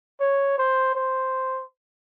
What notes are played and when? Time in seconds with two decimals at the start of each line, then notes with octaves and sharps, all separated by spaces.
0.20 C#5
0.58 C5
0.95 C5